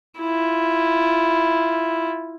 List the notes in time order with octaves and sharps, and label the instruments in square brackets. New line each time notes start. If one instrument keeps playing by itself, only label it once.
[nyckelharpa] E4 F4